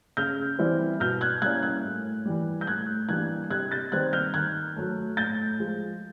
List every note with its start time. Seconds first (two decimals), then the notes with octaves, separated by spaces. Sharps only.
0.17 C#3 F6 G6
0.59 E3 G3 C4 E4
1.00 B2 F6 G6
1.21 F#6 G#6
1.42 G3 A#3 C#4 E4 F#6 G#6
1.63 F#6 G#6
1.84 A2
2.26 E3 G3
2.61 G6
2.67 A2 F#6 G#6
3.09 E3 G3 A#3 D4 F#6 G#6
3.50 C3 F#6 G#6
3.71 G6 A6
3.92 D#3 G3 C4 F#6 G#6
4.13 F6 G6
4.34 D#3 F#6 G#6
4.76 F#3 A3
5.17 A2 G6 A6
5.59 F3 G#3